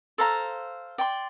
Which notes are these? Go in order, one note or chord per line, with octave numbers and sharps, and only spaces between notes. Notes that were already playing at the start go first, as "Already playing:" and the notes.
A4 C5 F5 A#5
D5 G5 C6